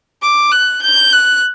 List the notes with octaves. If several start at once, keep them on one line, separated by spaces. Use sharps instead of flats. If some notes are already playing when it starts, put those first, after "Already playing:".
D6
F#6
G6
F#6